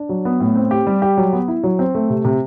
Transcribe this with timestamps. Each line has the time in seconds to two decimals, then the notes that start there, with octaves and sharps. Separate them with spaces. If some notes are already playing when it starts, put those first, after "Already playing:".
Already playing: D4
0.09 F#3
0.25 B3
0.40 A2
0.56 C4
0.71 G4
0.87 G3
1.02 G4
1.17 F#3
1.33 B3
1.48 E4
1.63 F#3
1.79 C4
1.95 A3
2.10 C3
2.25 C3